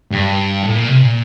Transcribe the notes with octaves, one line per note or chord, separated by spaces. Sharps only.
G2
A2
A#2
C3
A#2